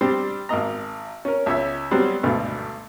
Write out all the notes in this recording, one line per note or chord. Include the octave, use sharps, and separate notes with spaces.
G3 C4 D4 G4
G#1 A#3 D#5 A#5
C#4 A#4
C#2 C#5 E5
F#3 G3 B3 C4
G#1 D2 G2 B2 A3